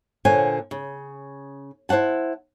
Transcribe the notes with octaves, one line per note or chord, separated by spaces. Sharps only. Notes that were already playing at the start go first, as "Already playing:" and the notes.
A#2 D3 C5 C#5 F#5 G#5
C#3
E4 C5 C#5 F#5 A5